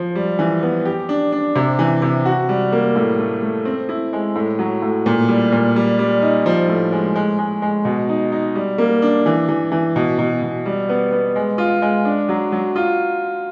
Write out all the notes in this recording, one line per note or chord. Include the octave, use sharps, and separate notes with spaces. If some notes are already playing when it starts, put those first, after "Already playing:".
Already playing: F3
G3
E3
B3
G4
D4
D4
C3
E3
C3
F#4
G3
A#3
A2
A3
A3
C4
E4
G#3
A2
F#3
A2
A#2
G3
A#2
G3
G3
D#4
F3
A2
G#3
G#3
G#3
G#3
B2
D#4
D#4
G3
A#3
D4
E3
E3
E3
B2
B2
B2
G3
B3
B3
G#3
F4
G#3
D4
F#3
F#3
F4